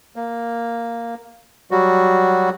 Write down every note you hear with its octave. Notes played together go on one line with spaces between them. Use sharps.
A#3
F#3 G3 F#4